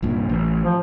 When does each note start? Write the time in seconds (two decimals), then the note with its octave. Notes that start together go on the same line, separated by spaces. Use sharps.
0.03 C2 G2 A#2
0.29 A1
0.63 F3